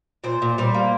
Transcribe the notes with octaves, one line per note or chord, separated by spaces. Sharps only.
A#2 C5
A#2
G3 C5
A#3